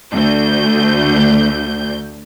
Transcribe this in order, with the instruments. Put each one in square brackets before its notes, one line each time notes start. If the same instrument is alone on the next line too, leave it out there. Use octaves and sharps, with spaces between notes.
[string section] D2 G6